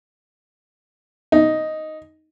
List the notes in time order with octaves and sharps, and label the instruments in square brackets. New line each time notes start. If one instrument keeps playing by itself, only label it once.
[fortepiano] D#4